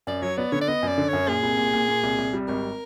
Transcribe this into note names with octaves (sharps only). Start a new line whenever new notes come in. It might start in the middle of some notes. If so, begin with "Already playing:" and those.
F#2 D5
F#3 C#5
B3 D5
D3 C#5
D5
B3 D#5
F#2 D5
D3
F#2 C#5
A#2 G#4
C2
A#2
A#2
A#2
C2
C2
G3
G#1 A#4